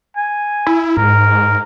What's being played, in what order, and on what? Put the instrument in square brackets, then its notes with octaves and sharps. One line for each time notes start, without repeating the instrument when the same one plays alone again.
[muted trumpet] G#5
[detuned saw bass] E4
[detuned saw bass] G#2 [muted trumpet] A#4